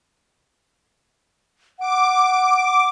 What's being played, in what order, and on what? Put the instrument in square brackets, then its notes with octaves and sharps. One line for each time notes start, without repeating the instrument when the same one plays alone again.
[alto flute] F#5 [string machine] D6